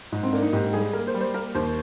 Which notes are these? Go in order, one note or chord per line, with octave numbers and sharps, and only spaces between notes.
G#2
C4
A#3 D4
D#4
G#2 G4
G3 G#4
A#3 A#4
C5
G3
C5
A#3 A#4
D#2 C5